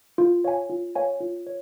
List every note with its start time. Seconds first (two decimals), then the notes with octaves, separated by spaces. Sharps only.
0.18 F4
0.44 C#5 F5 G#5
0.70 F4
0.95 C#5 F5 G#5
1.20 F4
1.47 C#5